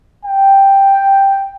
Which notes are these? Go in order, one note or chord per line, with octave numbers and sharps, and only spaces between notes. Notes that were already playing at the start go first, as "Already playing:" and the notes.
G5